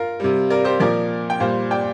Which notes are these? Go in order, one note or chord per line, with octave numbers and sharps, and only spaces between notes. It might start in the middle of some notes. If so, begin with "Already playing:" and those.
Already playing: F4 A#4
C3 G3
A#4 D5
G4 C5
A#2 F3 A#4 D5
G5
A#2 G3 C5 F5
D5 G5